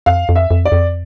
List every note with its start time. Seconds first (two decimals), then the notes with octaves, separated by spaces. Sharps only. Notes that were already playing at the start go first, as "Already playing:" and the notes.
0.06 F2 F5
0.29 F2
0.36 E5
0.51 F2
0.65 D5
0.72 F2